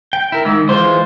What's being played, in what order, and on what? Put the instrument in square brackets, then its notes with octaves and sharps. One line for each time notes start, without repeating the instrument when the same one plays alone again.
[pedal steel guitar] G5
E4 A#4
[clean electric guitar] G#2 [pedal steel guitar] D#3 E6
[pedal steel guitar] E3 G#3 F4 [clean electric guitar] C5